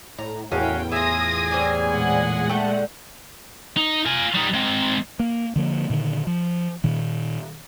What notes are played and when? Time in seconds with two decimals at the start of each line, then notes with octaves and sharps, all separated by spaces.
0.18 A2 A#5
0.51 E2 A2 C#4 F#4 A#4 F5 G5
0.92 E4 F4 G#4 G#5 D#6 A#6
1.51 E3 G3 C4
1.90 A#2 G#3 F#5
2.49 D3 A3 G5
3.77 D#4
4.06 F4 G#5
4.35 G3 D#4
4.54 G#3 C4
5.20 A#3
5.56 D3 F3 A#3
5.90 A#2 D3 D#3
6.27 F3
6.84 A#2 D#3